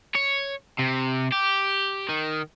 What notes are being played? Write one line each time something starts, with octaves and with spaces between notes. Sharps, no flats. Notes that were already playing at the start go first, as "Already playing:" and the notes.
C#5
C3
G4
D#3